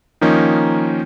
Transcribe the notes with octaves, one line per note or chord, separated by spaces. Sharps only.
D#3 F3 A#3 C#4 D#4